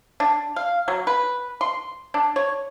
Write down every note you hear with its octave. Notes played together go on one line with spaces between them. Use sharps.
D4
F5
F#3
B4
C6
D4
C#5